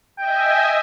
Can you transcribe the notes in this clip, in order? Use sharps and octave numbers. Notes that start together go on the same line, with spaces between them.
D#5 E5 G5 G#5